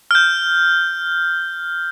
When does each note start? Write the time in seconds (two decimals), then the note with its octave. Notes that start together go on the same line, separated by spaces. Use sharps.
0.11 F6 G6